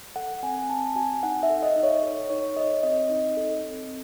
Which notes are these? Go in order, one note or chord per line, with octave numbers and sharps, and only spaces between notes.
A4 F#5
C4 G#5
C4 A5
F#4 G#5
D#4 F#5
E5
A4
D#5
D#4
C#5
A4 C#5
D#4 C#5
A4 D#5
C4 D#5
D#4
A4
C4